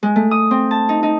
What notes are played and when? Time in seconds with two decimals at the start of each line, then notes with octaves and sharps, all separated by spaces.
0.03 G#3
0.16 A3
0.31 D#6
0.51 C4
0.71 A5
0.89 D#4
1.03 D#4